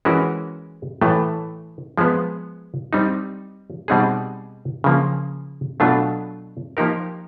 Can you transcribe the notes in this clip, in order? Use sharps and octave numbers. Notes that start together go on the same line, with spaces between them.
E3 G#3 C#4 F#4 A#4
A2 E3 A3
F3 G#3 B3
G3 C4 D#4
B2 G3 C4 D#4 G#4
C#3 F3 A#3
B2 F#3 A3 D4 F4
F3 A#3 D#4 G4 A#4